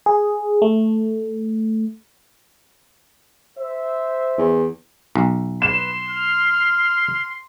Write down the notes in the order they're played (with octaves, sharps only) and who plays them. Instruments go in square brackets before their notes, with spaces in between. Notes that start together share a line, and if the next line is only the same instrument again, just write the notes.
[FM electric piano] G#4
A3
[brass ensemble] C5 E5
[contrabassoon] E2
[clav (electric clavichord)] B1
[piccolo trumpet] B4 [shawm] C6 [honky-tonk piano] E7
[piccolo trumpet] F6